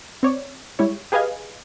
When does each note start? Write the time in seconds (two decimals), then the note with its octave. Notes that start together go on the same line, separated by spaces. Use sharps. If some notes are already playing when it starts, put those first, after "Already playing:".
0.23 C4 C#5 D5
0.79 G3 G#3 E4 C#5
1.12 G4 G#4 B4 D#5 F5 G#5